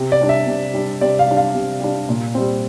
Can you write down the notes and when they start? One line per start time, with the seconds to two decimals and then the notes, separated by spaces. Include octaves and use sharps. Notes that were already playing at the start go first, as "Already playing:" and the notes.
Already playing: C3
0.12 D5
0.21 G3 D4
0.29 E5
0.47 C3
0.74 G3 D4
1.01 C3 D5
1.19 F5
1.27 G3 D4
1.37 F5
1.55 C3
1.81 G3 D4
2.09 A#2
2.35 G3 C4